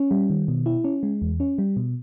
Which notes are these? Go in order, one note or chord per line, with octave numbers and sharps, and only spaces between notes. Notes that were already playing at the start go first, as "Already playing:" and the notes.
Already playing: C#4
G3
D#3
B2
E4
C#4
G#3
E2
C#4
G3
B2